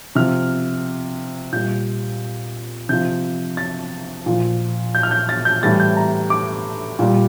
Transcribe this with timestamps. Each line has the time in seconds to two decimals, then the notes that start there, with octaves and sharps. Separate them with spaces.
0.15 C3 F3 F6
1.52 A#2 G3 G6
2.89 C3 F3 G6
3.57 A6
4.26 A#2 F3
4.95 G6
5.03 F6
5.11 G6
5.29 A6
5.45 G6
5.63 A2 E3 G3 A6
5.80 G6
5.97 A#5
6.30 D6
6.99 A#2 G3